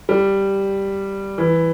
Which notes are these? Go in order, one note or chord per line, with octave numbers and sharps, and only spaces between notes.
G3
E3